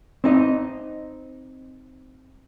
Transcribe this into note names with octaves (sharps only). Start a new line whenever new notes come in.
C4 D#4 D#5